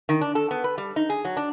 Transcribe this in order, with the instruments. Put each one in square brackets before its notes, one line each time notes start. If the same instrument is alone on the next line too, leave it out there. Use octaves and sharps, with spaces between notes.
[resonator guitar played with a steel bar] D#3
D4
A4
B3
B4
G3
D#4
G#4
F#3
D4